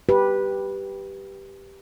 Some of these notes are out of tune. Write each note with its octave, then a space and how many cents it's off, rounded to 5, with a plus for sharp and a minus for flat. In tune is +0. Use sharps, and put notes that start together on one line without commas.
G4 +0 B4 -10